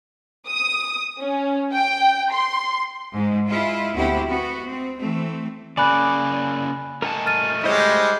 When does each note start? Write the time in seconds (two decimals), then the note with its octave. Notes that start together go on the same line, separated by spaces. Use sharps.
0.47 D#6
1.18 C#4
1.72 G5
2.32 C6
3.13 G#2 G#3
3.47 G#3 E4 F4
3.95 D2 B3 C4 E4 F#4 G4
4.26 B3 F#4
4.68 C4
4.98 E3 A3 C4
5.77 C#3 A#3 D5 G#5 B5 F#6
7.02 A3 D#4 A#4 F#5 G#5 A5
7.26 F6 A6 D#7
7.64 G3 G#3 E4 C5 C#5 D#5
7.80 C5 G6